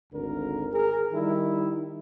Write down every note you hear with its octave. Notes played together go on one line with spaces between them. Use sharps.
G#1 D2 D3 A#4
G#4 A#4
D#3 G3 D#4 E4